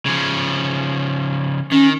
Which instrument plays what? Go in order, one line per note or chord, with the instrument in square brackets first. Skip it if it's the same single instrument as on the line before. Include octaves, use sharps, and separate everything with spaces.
[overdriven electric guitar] C#3 F3
[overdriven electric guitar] D#3 [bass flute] C#4